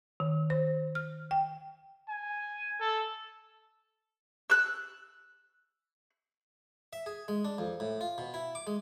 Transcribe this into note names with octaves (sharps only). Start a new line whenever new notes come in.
D#3
C5
F6
G5
G#5
A4
E6 F#6
E5
G#4
G#3
D4
F2
A2
F4
B2
E4
D6
G#3